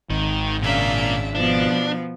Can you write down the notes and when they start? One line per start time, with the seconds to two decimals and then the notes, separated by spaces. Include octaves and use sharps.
0.10 G#1 D#3
0.62 A#2 C#3 A#3 C#4 D4 E5 F5
1.35 B2 F3 B3 D4